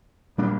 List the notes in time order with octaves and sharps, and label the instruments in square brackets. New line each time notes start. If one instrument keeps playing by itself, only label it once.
[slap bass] A#2 G3 A#3 D4